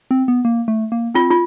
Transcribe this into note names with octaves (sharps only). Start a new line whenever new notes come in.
C4
B3
A#3
A3
A#3
C4 F4
F4